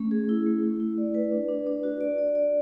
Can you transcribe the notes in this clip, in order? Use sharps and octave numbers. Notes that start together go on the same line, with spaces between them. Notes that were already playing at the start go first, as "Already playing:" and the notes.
Already playing: A3 C#4
G#4
E4
A3
E4
E4
D5
B4
D4
D4
D4
F#4
D5
D5
D5